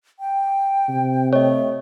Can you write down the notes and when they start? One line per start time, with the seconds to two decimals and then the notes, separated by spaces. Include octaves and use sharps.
0.19 G5
0.89 C3
1.33 A3 C#5 D#5